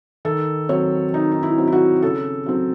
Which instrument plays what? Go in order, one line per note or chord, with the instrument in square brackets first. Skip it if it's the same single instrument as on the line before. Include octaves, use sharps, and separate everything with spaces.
[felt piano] D#3 A4
F#3 C4 C#5
D#3 D#4
D#4
E4
F#3 C4
E4
F#4
C#3 A4
F#3 C4